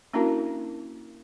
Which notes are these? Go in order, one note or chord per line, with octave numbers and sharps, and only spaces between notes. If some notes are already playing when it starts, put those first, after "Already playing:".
A#3 C#4 D4 E4 F#4 A#4